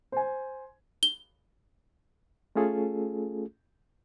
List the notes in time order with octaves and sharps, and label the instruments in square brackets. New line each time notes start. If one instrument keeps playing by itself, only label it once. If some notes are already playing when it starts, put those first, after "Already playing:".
[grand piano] C5 G#5
[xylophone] G7
[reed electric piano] A3 C#4 F4 G#4 A4